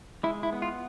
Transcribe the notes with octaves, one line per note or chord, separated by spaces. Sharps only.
G#3 E4
E4
B3
F4